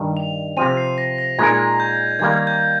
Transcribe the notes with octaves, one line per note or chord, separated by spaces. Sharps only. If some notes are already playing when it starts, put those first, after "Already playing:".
Already playing: G2 D#3 G3
F7
C3 F3 C4 D#7
C7
A#6
A#6
A#2 G#3 D#4 A#4 G#6
G6
D#3 G3 A#3 G#6
G6